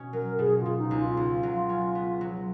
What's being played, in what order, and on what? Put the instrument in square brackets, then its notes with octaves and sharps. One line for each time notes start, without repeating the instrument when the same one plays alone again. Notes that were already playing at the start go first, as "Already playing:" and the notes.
Already playing: [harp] B2 C#4
[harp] F#3 [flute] A#4
[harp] B2 [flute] G#4
[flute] F4
[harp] B2
[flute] D#4
[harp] C#2
[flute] F4
[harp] C#2
F#3
C#4
B3
F#3